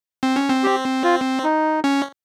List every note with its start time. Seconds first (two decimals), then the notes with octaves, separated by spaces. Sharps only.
0.23 C4
0.36 C#4
0.49 C4
0.64 G4
1.03 F4
1.44 D#4
1.84 C#4